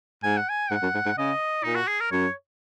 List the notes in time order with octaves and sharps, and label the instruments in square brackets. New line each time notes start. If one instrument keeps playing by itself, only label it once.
[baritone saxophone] G#2 [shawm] G#5
[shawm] F#5
G#5
[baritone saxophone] G#2 [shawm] F#5
[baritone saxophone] F#2
G#2
G#2
[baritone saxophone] C#3 [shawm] D#5
[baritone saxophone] A#2 [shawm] D#4
[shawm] F#4
G#4
A#4
[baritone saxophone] F#2 [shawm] C#5